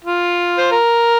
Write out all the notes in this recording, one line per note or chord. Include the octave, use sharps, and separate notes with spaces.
F4
C5
A#4